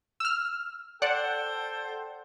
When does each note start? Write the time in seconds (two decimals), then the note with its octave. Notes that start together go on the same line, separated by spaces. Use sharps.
0.20 E6 F6
1.02 A4 C5 D5 F#5 G5